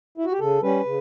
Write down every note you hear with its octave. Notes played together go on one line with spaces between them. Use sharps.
E4
F#4
G4
C#3 A4
G3 C#4 B4
C#3